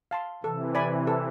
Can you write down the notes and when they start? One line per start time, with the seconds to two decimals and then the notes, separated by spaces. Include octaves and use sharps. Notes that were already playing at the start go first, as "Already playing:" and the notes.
0.11 F5 A5 C6
0.43 C3 E3 A4
0.75 D5 G#5 B5
1.07 A4